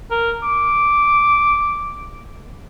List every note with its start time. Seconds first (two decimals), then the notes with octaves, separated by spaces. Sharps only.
0.11 A#4
0.43 D6